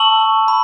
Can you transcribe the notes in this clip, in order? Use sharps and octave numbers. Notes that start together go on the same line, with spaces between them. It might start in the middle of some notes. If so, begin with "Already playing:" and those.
Already playing: A5 C#6 E6 F#7
B5